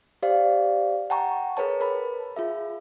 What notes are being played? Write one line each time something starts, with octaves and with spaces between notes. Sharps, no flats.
G4 C5 D5 F5
F#5 G5 A5 A#5 C#6
G#4 A#4 B4 C#5 A5
A#4 B4 A5 B5
F4 G#4 E5